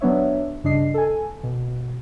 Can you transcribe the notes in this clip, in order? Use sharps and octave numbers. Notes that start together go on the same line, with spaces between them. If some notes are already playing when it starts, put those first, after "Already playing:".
F#3 B3 D4 C#5 E5
G2 C#3 D4 D#5 C7
A4 G#5
B2